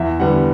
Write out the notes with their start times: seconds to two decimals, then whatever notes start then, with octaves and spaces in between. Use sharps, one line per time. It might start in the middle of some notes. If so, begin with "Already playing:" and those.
Already playing: E2 E5
0.20 D3 G3 B3 F#5